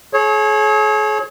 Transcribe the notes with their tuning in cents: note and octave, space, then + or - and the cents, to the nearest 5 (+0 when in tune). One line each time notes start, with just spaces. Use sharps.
G#4 +40 C#5 -20